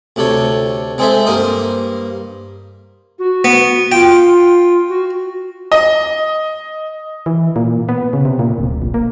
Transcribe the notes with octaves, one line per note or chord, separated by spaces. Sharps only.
D2 C3 D4 A4 C#5
G#3 C4 G#4 A4 C5 E5
G2 A#3 A#4 C5 D#6
F#4
B3
F4 G5
F#4
D#5
E3
A#2
B3
C#3
C3
A#2
D1
A#1
A#3